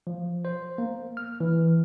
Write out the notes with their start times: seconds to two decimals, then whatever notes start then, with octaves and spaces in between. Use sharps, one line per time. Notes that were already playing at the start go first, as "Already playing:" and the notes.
0.07 F3
0.45 C5
0.78 A#3
1.17 F6
1.40 E3